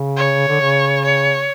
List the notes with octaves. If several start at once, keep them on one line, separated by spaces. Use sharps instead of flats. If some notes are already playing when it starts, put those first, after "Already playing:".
Already playing: C#3
C#5
D3
C#3
C#5